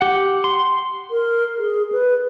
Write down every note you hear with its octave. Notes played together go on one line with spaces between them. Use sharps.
G4 F#5
C6
A#4
G#4
B4